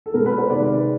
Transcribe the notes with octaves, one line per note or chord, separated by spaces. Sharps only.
A4
B2 G#3 B3 A#4
B4
C5
C3 D#3 G#3 C4 D5